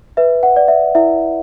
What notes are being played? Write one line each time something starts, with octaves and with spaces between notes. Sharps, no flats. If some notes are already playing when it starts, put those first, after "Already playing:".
B4 E5
F#5
D5
E5
E4 E5